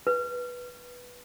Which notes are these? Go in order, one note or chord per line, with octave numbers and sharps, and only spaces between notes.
B4